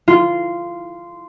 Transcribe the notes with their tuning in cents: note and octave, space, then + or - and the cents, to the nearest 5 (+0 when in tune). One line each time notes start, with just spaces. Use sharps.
F4 -15